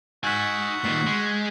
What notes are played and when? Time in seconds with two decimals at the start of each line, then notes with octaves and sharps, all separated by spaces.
0.23 D#4 F#4 G#5 E6 G6 B6
0.84 A#2 D#3 B6 C7
1.06 G#3